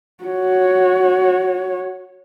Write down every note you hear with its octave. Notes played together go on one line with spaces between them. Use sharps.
F#4 C#5